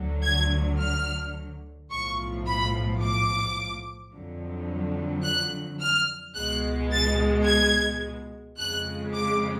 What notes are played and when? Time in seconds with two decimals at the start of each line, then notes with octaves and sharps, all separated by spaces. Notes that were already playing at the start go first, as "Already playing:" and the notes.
Already playing: D2 D3 F#3
0.23 G#6
0.79 F6
1.91 B1 A2 F3 C#6
2.47 B5
3.02 D6
4.13 F2 D3 F#3
5.24 F#6
5.80 F6
6.35 C#2 B2 G#3 F#6
6.92 A6
7.47 G#6
8.58 F2 C#3 G#3 F#6
9.14 D6